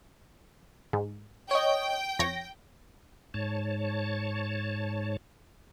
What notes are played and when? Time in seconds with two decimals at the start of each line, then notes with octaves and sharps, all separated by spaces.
0.93 G#2
1.51 C#5 D#5 G5
2.19 F2 C#5 A#6
3.34 G#2 C#5 A5